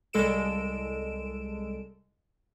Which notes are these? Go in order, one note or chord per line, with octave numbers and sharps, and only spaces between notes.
C2 G#3 A4 D7 E7